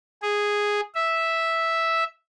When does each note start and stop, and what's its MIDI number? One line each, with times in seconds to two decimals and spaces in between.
0.22 0.81 68
0.95 2.04 76